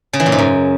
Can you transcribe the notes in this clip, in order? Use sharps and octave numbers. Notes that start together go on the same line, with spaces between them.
C#3
E3
A#2
G#2
F#2